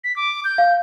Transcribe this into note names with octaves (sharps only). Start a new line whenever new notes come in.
B6
D6
G6
F5